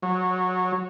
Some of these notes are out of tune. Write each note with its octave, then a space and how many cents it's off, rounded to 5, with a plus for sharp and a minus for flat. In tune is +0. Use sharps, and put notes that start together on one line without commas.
F#3 -15